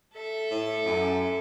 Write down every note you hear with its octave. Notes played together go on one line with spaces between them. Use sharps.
A4 E5
A2
F#2